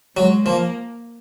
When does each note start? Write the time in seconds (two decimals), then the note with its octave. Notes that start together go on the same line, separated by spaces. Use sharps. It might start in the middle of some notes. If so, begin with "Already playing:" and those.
0.16 F#3 G#3
0.45 F3 A#3